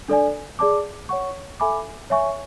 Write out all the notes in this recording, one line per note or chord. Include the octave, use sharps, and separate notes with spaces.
D4 A4 D5 G#5
G#4 D5 A5 D6
C#5 F#5 C#6
A4 E5 G#5 B5 D6
C#5 E5 G#5 C#6